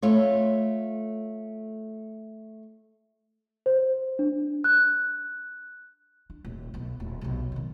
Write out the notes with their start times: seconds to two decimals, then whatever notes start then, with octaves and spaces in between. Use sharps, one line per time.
0.02 A3 F4 C#5
3.66 C5
4.19 D4
4.64 F#6
6.30 D4
6.45 D#1
6.74 B1 B3
7.00 D#1
7.21 B1 C3
7.52 A#2 D#3